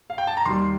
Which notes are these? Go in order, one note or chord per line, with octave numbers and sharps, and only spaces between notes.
F5
G5
A5
A#5
D#2 D#3 G3 C6